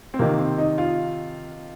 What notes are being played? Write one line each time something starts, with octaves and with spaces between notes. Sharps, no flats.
C4
C3 D#3 A#3
C4
D#4
F4